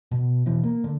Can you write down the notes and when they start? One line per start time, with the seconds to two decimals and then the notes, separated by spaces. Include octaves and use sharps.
0.11 B2
0.46 B2 E3
0.63 A#3
0.84 D3